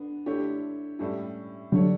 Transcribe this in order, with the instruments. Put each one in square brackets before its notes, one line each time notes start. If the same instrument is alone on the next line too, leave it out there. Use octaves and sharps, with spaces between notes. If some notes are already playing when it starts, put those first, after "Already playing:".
Already playing: [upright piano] D3 B3 D4
D3 A3 E4 G4 C#5
A2 G3 C#4 E4 A4
[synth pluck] D3 F#3 [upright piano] G3 D4 A4 C#5